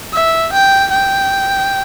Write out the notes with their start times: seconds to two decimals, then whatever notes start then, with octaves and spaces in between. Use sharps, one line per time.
0.13 E5
0.52 G5
0.91 G5